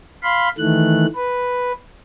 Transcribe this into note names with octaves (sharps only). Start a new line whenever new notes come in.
F5 B5 C6
D#3 E3 A3 F#6
B4